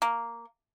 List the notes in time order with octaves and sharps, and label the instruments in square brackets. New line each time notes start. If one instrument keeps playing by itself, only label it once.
[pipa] A#3